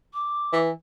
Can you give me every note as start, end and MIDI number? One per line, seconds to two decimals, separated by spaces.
0.14 0.59 86
0.53 0.71 52